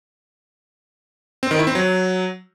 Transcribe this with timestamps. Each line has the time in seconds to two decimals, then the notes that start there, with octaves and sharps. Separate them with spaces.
1.43 C4
1.51 D#3
1.59 E4
1.67 C4
1.75 F#3